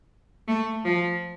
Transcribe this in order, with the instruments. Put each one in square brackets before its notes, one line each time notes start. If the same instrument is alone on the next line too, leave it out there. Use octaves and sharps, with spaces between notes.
[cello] A3
F3